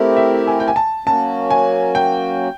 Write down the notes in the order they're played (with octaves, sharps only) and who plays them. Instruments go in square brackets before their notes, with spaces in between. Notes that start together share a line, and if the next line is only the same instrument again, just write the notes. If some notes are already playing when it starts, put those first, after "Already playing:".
Already playing: [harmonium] A3 C4 E4 G4 A#4
[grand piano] E5
G#5
G5
G#5
A5
[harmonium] F#3 A#3 C#4 F#4 [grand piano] A5
[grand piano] G#5
G5